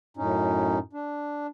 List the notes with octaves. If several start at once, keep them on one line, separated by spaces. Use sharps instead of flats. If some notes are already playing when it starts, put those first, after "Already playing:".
F#2 A2 C#4 D#4
D4